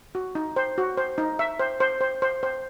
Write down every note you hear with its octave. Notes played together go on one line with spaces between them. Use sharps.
F#4
D#4
C5
F#4
C5
D#4
E5
C5
C5
C5
C5
C5